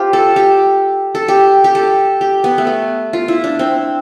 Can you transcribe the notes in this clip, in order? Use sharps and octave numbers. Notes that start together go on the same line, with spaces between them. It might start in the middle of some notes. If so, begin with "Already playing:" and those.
Already playing: C4 F4 G4
A4
G4
A4
G4
G4
A4
G4
B3
A3
B3
F4
E4
D4
C4